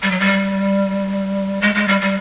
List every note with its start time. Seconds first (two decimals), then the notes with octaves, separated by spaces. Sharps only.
0.02 G3
0.11 F#3
0.20 G3
1.62 G#3
1.75 G#3
1.88 G3
2.01 G3